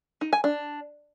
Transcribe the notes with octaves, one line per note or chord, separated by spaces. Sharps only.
D#4
G#5
D4